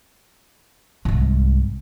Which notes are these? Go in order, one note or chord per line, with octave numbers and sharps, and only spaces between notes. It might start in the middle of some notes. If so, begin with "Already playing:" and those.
C2 G#2